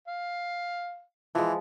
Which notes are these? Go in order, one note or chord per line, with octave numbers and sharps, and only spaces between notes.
F5
E3 F3 G#3